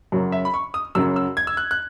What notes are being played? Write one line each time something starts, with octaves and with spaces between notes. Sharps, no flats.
F#2 C#3 F#3
E5
B5
C#6
D#6
F#2 C#3 F#3 E6
E6
G#6
E6
F#6
F#6